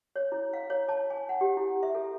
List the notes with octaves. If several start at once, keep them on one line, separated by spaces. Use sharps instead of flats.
C#5
E4
F5
C#5
A5
G#5
F#5
G4
E4
E5
A4